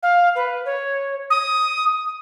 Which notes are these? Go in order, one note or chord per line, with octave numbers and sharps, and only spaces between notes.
F5
B4
C#5
D#6